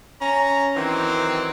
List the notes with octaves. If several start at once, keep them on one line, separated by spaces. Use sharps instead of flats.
C#4 A#5
D#3 E3 F#3 C4